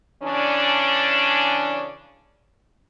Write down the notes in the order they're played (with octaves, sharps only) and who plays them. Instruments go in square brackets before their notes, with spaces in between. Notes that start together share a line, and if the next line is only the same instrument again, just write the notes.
[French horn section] C#3 E3 C#4 D4